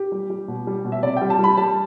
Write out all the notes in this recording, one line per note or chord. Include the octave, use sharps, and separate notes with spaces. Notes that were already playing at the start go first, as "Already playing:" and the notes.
Already playing: G4
G3
G3
B2
G3
B2
E5
C3 D5
G3 G5
A5
G3 B5
G3 A5